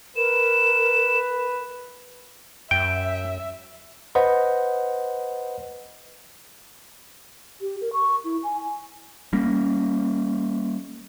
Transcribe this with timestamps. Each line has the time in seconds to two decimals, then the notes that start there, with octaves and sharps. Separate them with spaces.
0.16 A#4 B4 E7
2.71 F#2 E5 G5
4.15 B4 C5 D#5 F#5
7.61 G4
7.81 A#4
7.93 C#6
8.24 E4
8.44 G#5
9.33 G3 A#3 C#4